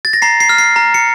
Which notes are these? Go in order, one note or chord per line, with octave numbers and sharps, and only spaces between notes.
A6
A#6
A#5 C7
C7
F6
C7
A#5
C#7